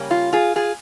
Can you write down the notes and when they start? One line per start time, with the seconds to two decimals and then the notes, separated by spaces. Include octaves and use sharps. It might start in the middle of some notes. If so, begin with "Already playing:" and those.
Already playing: C#3 G3 A#3 C#4
0.11 F4
0.33 F4 G#4
0.56 F4 G#4